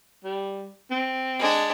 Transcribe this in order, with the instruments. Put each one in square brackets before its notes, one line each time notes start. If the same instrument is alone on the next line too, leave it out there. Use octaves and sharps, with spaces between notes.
[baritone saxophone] G3
C4
[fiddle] G#3 D4